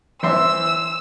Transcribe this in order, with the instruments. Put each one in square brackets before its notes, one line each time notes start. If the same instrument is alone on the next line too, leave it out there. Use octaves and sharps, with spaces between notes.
[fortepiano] E3 C5 E5 [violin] E6